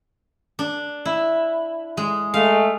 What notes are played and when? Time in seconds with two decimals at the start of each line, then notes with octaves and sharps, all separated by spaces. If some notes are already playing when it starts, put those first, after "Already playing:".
0.59 D4
1.05 E4
1.97 G#3
2.34 G#3 A3 F5